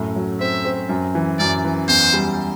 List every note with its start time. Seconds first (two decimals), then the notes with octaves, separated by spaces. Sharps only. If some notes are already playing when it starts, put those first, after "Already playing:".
Already playing: F#2 A2 A3
0.16 F#3
0.40 C4 E5
0.65 C4
0.89 F#2
1.15 E3
1.39 F#2 D5
1.65 E3
1.88 E2 C5
2.13 G3